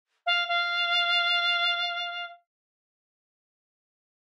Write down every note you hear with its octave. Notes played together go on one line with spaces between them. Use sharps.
F5
F5